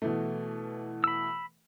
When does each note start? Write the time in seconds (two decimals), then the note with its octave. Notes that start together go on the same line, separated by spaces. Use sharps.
0.02 B2 E3 A3
1.04 B5 E6